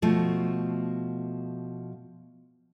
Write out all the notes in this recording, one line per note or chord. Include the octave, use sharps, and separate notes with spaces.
B2 F3 A3